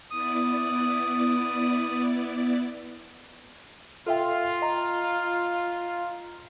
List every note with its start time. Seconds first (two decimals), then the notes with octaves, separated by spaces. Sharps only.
0.11 B3 E4 D5 D#6
4.07 F4 A4 E5 G5
4.62 D#5 A#5